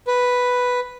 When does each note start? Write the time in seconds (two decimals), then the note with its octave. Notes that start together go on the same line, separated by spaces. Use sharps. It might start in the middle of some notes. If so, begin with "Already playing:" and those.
0.07 B4